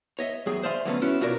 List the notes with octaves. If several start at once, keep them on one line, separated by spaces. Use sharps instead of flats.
C#5 D#5 E5
E2 F#3 G#4 G5
C5 D5 E5 F5 G#5 C6
D3 F3 F#3 A3 B3 C#4
B3 C#4 E4 F#4
B2 F4 F#4 A#4 D5